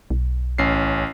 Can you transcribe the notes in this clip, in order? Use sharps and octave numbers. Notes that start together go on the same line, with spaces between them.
B1
A1 C#4 C7